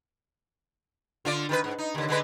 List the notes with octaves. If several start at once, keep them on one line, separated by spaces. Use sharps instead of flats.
D3 F4 D5
D#3 G3 B4
G#2
D#4
D#2 D3
D3 G#3 B4